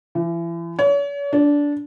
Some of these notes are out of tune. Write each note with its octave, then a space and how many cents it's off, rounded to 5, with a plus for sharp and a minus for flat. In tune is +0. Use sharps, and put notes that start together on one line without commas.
E3 +35
C#5 +40
D4 -15